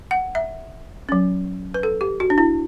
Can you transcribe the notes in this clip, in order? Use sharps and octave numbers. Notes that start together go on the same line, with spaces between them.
F#5
E5
F#3 C#4
B4
A4
G4
F#4
D4
E4